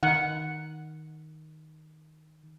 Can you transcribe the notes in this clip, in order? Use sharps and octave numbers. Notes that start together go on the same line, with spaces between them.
D#3 F#5